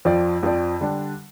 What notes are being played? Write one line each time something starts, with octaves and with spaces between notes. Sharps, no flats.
F2 F3 C4 F4 D5
F2 F3 C4 F4 D5
D3 G3 D4